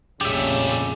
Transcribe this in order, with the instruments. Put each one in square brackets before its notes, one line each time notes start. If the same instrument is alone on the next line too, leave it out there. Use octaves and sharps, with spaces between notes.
[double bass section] A#1 F2 [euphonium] C#3 [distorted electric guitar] G3 A3 [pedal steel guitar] G4 E5